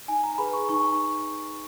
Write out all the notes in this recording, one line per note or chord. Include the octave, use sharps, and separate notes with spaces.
D#4 G#5
A#5
A#5
G#4 B4 B5
C#6
D#4 C#6